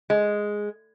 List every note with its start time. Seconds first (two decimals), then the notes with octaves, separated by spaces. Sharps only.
0.10 G#3